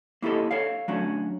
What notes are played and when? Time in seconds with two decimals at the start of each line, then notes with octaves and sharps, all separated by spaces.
0.22 A#3 E4 G4 A4 D#5
0.51 A4 C#5 F5
0.88 F#3 A3 C#4 D4 F#4